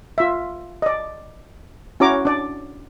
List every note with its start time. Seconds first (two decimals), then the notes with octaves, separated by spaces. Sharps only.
0.18 F4 E5
0.82 D5 D#5
2.00 C#4 E4 F#4 C#5 A#5 D6
2.25 D4 D5